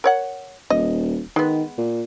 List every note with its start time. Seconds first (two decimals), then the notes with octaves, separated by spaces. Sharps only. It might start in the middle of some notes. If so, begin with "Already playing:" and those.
0.04 A#4 C#5 F#5
0.70 D#1 D#5
1.36 D#3 G#3 B3
1.78 A#2